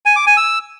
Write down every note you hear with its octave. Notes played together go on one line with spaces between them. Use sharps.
G#5
D6
G#5
E6